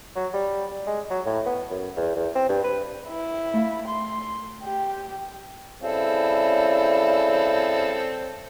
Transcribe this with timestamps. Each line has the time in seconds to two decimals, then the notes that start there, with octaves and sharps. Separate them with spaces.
0.16 F#3
0.34 G3
0.86 G#3
1.11 F#3
1.26 A2
1.46 B3
1.70 F#2
1.97 E2
2.16 E2
2.35 C4
2.49 G2
2.64 B4
3.08 E4
3.54 A3 E5 F5
3.88 C6
4.63 G4
5.81 C#3 G3 C4 E4 A4